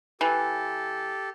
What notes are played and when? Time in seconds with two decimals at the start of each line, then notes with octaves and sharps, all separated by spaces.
0.21 E3 G4 A4